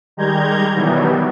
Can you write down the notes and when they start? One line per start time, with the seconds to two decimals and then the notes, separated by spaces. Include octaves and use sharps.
0.17 D#3 G3 G#3 A#5 G6 G#6
0.76 B2 D#3 E3 F#3 G3 B3